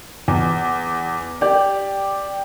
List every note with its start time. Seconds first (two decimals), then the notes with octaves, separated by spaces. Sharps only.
0.28 E2
1.41 G4 D5